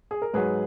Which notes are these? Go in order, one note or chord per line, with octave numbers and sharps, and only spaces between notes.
G#4
A#4
G#2 F#3 G#4 B4